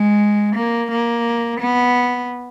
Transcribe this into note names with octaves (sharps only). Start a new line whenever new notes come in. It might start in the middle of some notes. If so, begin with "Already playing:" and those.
Already playing: G#3
A#3
A#3
B3